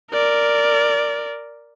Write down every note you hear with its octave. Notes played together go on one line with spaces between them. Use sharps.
A#4 D5